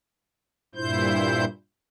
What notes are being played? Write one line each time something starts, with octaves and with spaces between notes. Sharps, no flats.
G2 A#2 E4 C5 G6